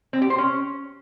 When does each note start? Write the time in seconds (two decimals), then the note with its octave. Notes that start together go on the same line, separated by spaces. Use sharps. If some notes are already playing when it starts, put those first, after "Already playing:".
0.13 C4
0.22 G4
0.30 C5
0.38 C#4